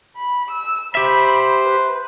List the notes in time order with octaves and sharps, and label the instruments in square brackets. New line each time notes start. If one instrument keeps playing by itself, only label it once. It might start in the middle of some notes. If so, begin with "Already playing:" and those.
[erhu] B5
E6
[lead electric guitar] G4 E5 [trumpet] C5 [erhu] B5
[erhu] B4